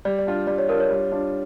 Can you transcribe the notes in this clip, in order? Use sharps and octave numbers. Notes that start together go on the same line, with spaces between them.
G3 D5
D5
D4 F4
G3 D5
C#5
D4 F4 A#4
C#5
G3
D4 F4